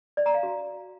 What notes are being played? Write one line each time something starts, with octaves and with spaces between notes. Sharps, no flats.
D5
A#5
F5
F#4